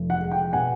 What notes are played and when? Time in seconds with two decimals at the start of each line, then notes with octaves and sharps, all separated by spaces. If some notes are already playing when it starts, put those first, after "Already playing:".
Already playing: F1
0.10 F#5
0.20 G#3
0.31 G5
0.53 B2 F#5 G#5